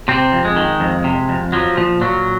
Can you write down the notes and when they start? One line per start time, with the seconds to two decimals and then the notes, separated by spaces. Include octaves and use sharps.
0.08 C3 C4
0.32 F2
0.44 G#3
0.56 D#3
0.80 F2
1.04 C3
1.29 F2
1.52 F3 F#3
1.77 A#2 F3
2.01 A#2 F#3